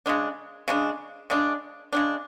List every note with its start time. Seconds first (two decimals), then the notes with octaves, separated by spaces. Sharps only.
0.06 C#3 G#3 D4
0.68 C#3 G#3 D4
1.30 C#3 G#3 D4
1.93 C#3 G#3 D4